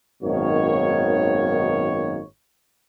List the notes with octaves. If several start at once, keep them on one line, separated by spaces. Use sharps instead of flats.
G#1 F#2 B2 D#3 A#3 C#5